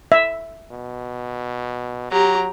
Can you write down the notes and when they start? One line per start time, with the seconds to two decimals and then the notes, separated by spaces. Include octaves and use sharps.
0.12 E5
0.71 B2
2.11 F#3 G4 A#5